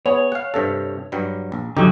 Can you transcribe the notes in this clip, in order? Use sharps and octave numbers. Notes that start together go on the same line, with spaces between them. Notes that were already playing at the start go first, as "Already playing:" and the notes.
B3 G#4 C#5
F5 F#5
G2 C3 A4
G2 F#3 G3
A#1
C2 D3 F#3 D#4 G4